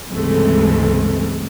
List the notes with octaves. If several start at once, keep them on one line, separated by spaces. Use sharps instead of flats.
C#2 G2 C3 E3 G#3 A3